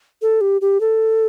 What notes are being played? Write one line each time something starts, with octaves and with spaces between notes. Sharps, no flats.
A4
G4
G4
A4